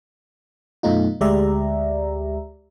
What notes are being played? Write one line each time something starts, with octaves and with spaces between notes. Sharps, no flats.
F#2 B2 A3 D#4 F4
D2 G#3 G4 D5 E5 A#5